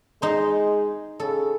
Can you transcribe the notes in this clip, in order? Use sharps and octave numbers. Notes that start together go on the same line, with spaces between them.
G#3 D#4 C5
C#3 A4